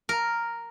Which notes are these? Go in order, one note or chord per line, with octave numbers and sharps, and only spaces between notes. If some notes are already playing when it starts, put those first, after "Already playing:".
A#4